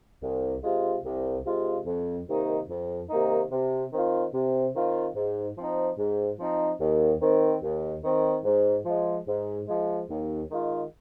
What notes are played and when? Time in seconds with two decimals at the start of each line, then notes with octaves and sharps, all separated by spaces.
0.21 C2
0.63 C3 G#3 F4
1.04 C2
1.45 C3 G#3 F4
1.86 F2
2.27 C3 D#3 A#3 D#4
2.68 F2
3.09 C3 D#3 A#3 D#4
3.51 C3
3.91 D#3 C4 F4
4.33 C3
4.74 D#3 C4 F4
5.15 G#2
5.56 F3 C4 D#4
5.97 G#2
6.39 F3 C4 D#4
6.80 D#2
7.20 D#3 C4
7.62 D#2
8.02 D#3 C4
8.44 G#2
8.85 F3 G#3
9.26 G#2
9.67 F3 G#3
10.08 D#2
10.50 D#3 G#3 F4